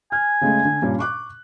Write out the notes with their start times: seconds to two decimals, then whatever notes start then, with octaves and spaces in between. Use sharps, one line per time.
0.12 G#5 F6
0.41 C#3 G#3 A3
0.65 D3
0.82 G2 A#2 C#4
0.99 C#6 D6 F#6